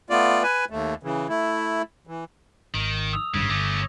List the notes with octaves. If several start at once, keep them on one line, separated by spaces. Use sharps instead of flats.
A3 B3 F4 D5
B4 G#5
D#2 A3
C#3 E3
A3 E4
E3
G#1 D#3
D#6 E6 F7
G#1 G2 C#3 G#6
G1 A3 C#4 D6 E6 A#6